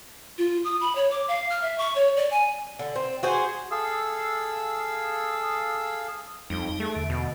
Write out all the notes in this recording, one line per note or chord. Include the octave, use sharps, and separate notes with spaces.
F4
D#6
B5
C#5
D6
F5
F6
E5
C#6
C#5
D5
G#5
D3
C4
F#4 G#4 C5
G#4 A4 F5 E6
F2 G3 D#4
A3 G#4
E2 D3
B2